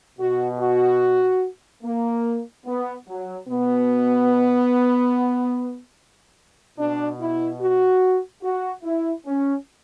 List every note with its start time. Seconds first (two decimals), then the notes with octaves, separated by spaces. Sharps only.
0.19 B2 F#4
0.59 F#4
1.83 A#3
2.65 B3
3.08 F#3
3.48 B2 B3
6.77 B2 D4
7.19 E4
7.60 F#4
8.42 F#4
8.83 E4
9.25 C#4